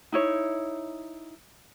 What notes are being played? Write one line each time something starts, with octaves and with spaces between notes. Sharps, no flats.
D#4 E4 C#5